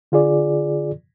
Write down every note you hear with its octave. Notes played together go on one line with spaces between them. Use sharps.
D3 F4 G#4 D5